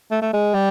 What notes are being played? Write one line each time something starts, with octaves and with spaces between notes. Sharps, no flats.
A3
A3
G#3
G3